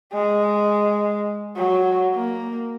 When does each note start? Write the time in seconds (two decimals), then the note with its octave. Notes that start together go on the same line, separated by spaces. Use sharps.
0.13 G#3
1.57 F#3
2.14 A#3